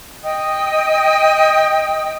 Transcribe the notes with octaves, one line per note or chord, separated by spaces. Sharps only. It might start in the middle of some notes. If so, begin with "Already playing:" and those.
D#5 G5 D#6